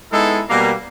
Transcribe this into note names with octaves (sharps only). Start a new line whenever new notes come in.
G#3 B3 D#4 E4 A4
B2 G3 A#3